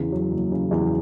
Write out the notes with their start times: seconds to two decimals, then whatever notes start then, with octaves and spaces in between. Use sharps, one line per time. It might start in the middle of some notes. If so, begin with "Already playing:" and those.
Already playing: E2 C#3
0.12 F#3
0.32 F#1
0.52 C#3
0.71 E2